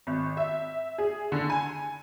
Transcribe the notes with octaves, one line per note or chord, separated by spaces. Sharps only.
G#1
E5
G#4
D3
G#5